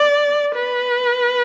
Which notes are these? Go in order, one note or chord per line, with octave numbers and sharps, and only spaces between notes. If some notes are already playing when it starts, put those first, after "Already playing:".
Already playing: D5
B4